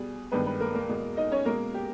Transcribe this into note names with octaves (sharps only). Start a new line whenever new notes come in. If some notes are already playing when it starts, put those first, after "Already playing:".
Already playing: B2 G3 G#4
G2 D#3 G#3 B3 B4
B3 B4
A#3 A#4
A#3 A#4
E2 B2 G#3
D#4 D#5
C#4 C#5
B2 G#3 A#3 A#4
G4